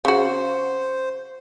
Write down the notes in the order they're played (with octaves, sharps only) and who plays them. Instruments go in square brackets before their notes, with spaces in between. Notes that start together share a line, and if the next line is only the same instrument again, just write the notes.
[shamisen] C#3 F#4 [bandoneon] C5